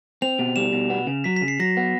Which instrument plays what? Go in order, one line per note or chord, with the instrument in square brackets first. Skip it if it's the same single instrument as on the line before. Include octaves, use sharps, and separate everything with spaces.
[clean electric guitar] C4 [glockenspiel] F7
[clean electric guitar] B2
[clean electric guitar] G3 [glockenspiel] E7
[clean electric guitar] B2
B3
C#3
[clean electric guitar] F#3 [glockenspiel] B6
[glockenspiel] B6
[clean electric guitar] C#3
[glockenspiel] C7
[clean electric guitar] F#3 [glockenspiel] A#6
[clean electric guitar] B3